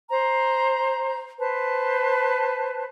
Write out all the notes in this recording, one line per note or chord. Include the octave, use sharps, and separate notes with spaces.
C5 A#5
B4 C5 A5